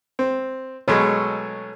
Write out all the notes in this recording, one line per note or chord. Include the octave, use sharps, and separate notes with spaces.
C4
B2 F#3 G#3 A4 C#5